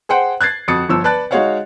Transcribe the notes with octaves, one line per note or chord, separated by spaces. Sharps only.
G#4 C5 F#5 G5
F#6 G#6 A6 C7
F2 F#4 D#6 A6 C#7
G1 F3 E6
B4 D5 A5 F#6 A6
G#3 D#4 F#4 C#5 F5 F#5